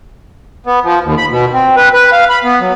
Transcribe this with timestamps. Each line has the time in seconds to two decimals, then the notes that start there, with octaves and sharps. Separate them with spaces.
0.66 B3
0.84 F3
1.04 D#2
1.18 B5
1.30 B2
1.53 C4
1.77 B4
1.94 B4
2.13 F5
2.29 B5
2.44 B3
2.60 F#3